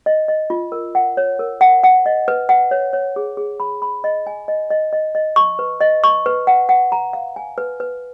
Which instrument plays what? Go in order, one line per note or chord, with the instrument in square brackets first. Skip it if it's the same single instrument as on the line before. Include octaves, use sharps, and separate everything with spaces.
[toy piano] D#5
D#5
F4
A#4
F#5
C#5
A#4
F#5
F#5
D#5
B4
F#5
C#5
C#5
G#4
G#4
B5
B5
D#5
G#5
D#5
D#5
D#5
D#5
C#6
B4
D#5
C#6
B4
F#5
F#5
A#5
F5
G#5
B4
B4